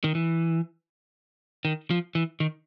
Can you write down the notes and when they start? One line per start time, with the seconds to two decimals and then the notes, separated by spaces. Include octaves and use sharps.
0.04 D#3
0.15 E3
1.65 D#3
1.90 F3
2.15 E3
2.40 D#3